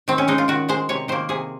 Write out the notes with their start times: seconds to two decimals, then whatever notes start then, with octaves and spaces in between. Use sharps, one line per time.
0.08 D#3 C4
0.18 C#4
0.28 G#3 D#4
0.38 F4
0.48 D#3 F#4
0.69 G#3 C5
0.89 C3 C#5
1.08 D#3 A#3 C5
1.29 C3 G#4